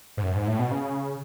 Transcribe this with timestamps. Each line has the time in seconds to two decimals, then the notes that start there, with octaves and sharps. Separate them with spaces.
0.17 G#2
0.23 F#2
0.36 G#2
0.48 A2
0.59 B2
0.71 C#3